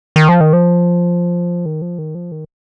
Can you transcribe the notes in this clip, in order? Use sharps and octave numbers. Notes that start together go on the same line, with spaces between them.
D#3
F3
D#3
F3
D#3
F3
D#3
F3
D#3